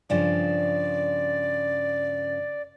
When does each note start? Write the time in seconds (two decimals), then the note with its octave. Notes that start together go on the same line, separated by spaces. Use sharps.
0.10 G2 C#3 F3 D5